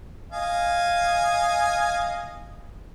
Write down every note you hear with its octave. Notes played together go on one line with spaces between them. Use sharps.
D#5 F5 G#5